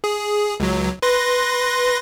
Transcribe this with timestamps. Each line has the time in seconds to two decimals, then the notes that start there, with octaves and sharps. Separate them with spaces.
0.04 G#4
0.60 C#2 F#3
1.02 B4 C6 A#6